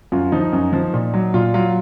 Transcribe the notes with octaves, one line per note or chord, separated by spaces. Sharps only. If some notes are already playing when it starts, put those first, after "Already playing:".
F#2 F4
F3 D#4
F#2
F3
A#2
F#3
A#2 F4
F#3 F4